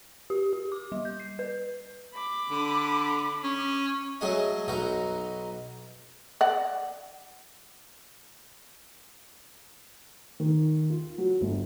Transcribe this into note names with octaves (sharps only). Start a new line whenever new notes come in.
G4
G4
D6
G3
G6
C7
B4
B5 D6
D3
C#4
F#3 A3 C#4 F#4 G#4 D#5
B1 B2 D#4 F#4 A#5
D5 F#5
D#3
F4
F#3
G1